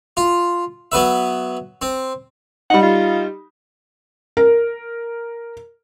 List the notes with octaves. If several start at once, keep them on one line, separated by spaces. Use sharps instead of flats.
F4
F#3 B3 B4 E5
C4
G3 D#4 F#5
F4
A#4